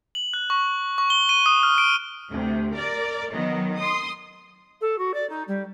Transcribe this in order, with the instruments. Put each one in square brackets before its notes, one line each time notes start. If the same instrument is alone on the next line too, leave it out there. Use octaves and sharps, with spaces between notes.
[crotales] F#7
F#6
C#6
C#6
G7
D#7
D#6
F6
D7
[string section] D2 C3
A#4 D5
D#3 F#3 B3
C6 D#6
[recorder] A4
F#4
D5
D#4
G3